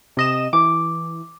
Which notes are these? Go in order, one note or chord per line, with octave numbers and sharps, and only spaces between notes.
C3 D#5 E7
E3 D6